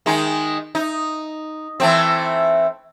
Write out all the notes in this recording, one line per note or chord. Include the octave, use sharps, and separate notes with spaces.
D#3 G#3 D#4
D#4
E3 A3 C4